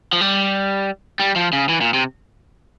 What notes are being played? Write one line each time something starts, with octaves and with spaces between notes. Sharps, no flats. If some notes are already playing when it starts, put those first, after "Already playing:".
F3
G3
G3
F3
C#3
E3
A#2
C3